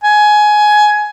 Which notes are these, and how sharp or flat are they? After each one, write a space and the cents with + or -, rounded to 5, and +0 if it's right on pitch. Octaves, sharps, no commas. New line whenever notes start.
G#5 +15